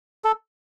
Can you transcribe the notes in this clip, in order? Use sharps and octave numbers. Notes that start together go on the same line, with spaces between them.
A4